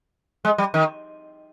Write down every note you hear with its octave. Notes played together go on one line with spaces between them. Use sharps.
G#3
G3
D#3